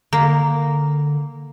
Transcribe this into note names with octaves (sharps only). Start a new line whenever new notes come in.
D3 A#3